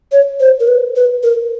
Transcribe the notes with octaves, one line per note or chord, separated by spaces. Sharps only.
C#5
C5
A#4
B4
B4
A#4